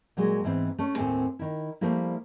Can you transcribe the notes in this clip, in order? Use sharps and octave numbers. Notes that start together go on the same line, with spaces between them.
A#2 F#3 G#3
G#2 E3 B3 C4 E4
A3 C#4
D#2 A2 C4 A4 G#5
D#3 E4
F3 G3 A3 A#3 E4